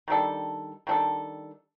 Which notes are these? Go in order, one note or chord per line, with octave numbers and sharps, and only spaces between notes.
D#3 G3 D4 A4
D#3 G3 D4 A4